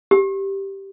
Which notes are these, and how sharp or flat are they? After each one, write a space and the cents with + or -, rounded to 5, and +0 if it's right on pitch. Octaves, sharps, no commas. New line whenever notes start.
G4 -5